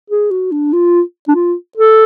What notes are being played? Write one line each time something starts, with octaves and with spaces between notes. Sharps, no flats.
G#4
F#4
D4
F4
D4
F4
A4